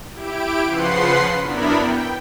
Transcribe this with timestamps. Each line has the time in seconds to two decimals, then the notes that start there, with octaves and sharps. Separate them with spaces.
0.12 E4 G4 D7
0.64 C#3 F3 B4 F#5 C6 C7
1.41 F#2 B3 D4 E4 A#4 B5
1.77 G5